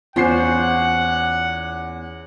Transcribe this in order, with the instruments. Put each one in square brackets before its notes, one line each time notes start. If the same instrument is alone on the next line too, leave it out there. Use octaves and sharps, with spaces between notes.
[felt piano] E2 G6 C7 [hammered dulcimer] C#4 [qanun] F4 C5 [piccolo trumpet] F#5